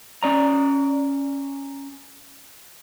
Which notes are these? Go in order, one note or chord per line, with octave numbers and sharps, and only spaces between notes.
C#4 D5 A#5